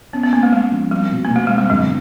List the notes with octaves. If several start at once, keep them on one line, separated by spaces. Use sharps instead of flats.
B3 C#4
B3
A#3 C#4
A3
G#3 C#4
F3
G3 C4
B2
A#3
B2
A3
G#3 C4
G3
G1 F#3